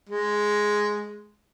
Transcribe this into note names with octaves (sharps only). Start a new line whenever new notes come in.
G#3